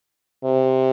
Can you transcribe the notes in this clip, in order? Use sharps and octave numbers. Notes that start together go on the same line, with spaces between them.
C3